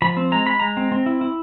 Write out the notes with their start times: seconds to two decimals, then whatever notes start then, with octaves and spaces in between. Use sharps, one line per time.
0.02 F3 B5
0.17 C4
0.32 G#3 A#5
0.46 G#3 B5
0.60 G#3 A#5
0.77 C4
0.92 C4
1.06 E4
1.21 E4